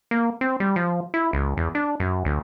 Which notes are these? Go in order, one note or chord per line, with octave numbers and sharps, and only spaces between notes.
A#3
C4
G3
F3
E4
C#2
E2
D4
F#2
D2